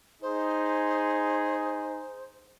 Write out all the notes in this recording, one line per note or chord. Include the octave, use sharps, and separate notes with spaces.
D#4 G#4 C5